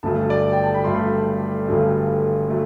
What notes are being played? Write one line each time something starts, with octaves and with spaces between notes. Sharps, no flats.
G1 G2 F#3 A3 A5
D5
G5
A5
B5
G1 G2 F#3 A3 C6
G1 G2 F#3 A3
F#3 A3